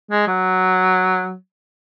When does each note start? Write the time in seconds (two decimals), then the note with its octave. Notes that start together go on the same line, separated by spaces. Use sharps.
0.11 G#3
0.27 F#3